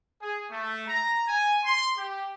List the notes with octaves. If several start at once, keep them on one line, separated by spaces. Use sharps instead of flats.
G#4
A3
A#5
G#5
C6
G4